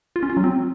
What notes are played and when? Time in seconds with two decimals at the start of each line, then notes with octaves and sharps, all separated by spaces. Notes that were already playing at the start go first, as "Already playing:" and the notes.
0.16 F4
0.23 C#4
0.30 F4
0.37 F#3
0.44 C4